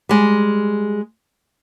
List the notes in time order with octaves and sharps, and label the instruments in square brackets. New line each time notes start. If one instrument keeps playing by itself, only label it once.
[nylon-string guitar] G3 G#3